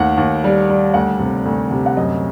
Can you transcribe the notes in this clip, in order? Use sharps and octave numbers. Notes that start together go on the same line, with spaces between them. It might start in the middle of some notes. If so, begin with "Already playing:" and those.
Already playing: D#2 A3 F#5
D#2
G3
G3
D2 F#5
C3
D2
C3
F#5
F#2 D#5